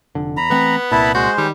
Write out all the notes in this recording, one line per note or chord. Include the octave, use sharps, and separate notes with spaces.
F1 D3
E2 A#5 B5
E3 A3 B3 C4
C2 A#2 E4 A5 B5
G#3 F#4 C5
D#3 G3